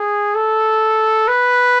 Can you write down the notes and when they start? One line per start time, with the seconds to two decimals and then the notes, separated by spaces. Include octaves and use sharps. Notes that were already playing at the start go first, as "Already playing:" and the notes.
Already playing: G#4
0.35 A4
1.27 B4